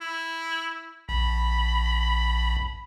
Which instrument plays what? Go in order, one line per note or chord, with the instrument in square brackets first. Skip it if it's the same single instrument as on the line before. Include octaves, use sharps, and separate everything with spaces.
[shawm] E4
[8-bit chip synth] A#1 [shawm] B5